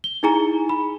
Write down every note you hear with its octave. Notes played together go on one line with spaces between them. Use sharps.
G7
D#4 E4 G#4 G#5 A#5
B5